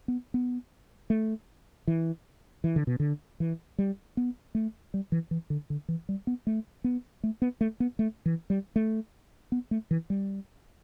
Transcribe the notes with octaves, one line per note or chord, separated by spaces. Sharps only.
B3
B3
A3
E3
E3
D3
B2
D3
E3
G3
B3
A3
G3
E3
E3
D3
D3
E3
G3
B3
A3
B3
A3
B3
A3
B3
A3
E3
G3
A3
B3
A3
E3
G3